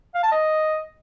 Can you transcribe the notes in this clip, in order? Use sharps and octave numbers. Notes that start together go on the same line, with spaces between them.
F5
A5
D#5